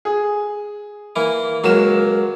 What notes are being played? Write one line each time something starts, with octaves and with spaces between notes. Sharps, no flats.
G#4
E3 A#3 E4
C#2 F#3 A#3 F#4 E7